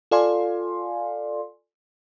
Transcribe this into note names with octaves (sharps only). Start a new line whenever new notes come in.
F4 A4 D5 F5 G#5 C6